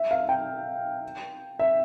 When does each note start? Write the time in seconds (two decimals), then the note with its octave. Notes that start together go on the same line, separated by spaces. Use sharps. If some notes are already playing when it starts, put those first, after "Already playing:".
Already playing: E5
0.11 F5
0.29 G5
1.59 E5